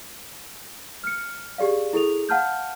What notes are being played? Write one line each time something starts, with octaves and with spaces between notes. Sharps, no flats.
F6 C#7
G4 G#4 D5 F5
E4 G#4 A4 F7
F5 F#5 A5 F6 G6